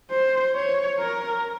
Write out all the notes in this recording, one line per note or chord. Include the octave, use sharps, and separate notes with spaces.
C5
C#5
A#4